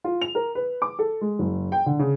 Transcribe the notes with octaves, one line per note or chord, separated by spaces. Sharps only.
F4
F7
A#4
B4
D6
A4
G#3
F#1
G5
D3
C#3